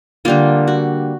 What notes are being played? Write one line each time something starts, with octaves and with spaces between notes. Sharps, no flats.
D3 G3 A#3 F4
F#4